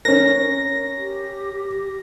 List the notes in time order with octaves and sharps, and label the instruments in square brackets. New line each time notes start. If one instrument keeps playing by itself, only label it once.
[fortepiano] C#4 A#4 [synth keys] A#6
[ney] G4